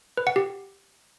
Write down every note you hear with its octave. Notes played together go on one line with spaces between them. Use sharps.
B4
F#5
G4